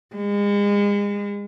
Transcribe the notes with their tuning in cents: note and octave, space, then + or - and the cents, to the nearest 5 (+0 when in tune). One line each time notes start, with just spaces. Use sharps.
G#3 -35